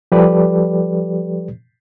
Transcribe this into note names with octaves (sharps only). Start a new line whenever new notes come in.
F3 G3 G4 A4 B4 D5